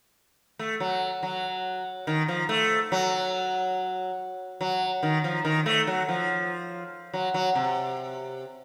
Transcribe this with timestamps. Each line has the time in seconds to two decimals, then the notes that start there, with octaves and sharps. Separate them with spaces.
0.59 A3
0.80 F#3
1.23 F#3
2.07 D#3
2.28 F3
2.49 A3
2.92 F#3
4.61 F#3
5.03 D#3
5.24 F3
5.45 D#3
5.66 A3
5.87 F#3
6.08 F3
7.14 F#3
7.34 F#3
7.55 C3